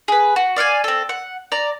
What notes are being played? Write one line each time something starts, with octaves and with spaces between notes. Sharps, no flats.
G#4 B4
F#4
D5 F5 F#5 G#5
C4 A4
F#5
D5 A#5